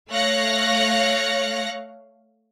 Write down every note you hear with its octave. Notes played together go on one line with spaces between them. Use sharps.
A3 C#5 F5 F#6 A#6 C#7